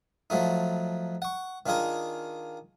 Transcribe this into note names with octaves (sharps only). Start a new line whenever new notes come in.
F3 F#3 A3 D#4
F#5 C#6
D#3 D4 F4 G#4 A#4